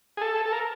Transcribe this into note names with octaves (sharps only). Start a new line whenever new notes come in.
G#4
A4
A4
A#4